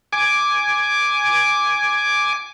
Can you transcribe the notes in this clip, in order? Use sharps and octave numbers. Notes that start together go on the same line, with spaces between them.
G#5 D6